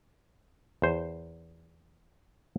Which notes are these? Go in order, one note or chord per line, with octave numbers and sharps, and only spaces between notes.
E2 C5